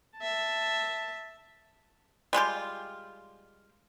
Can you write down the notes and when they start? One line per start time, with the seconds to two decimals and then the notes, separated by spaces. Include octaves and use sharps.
0.18 E5 A5
2.33 G3 G#3 F4 G4